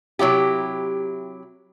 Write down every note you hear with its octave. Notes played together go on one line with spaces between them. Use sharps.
C3 F#3 E4 G4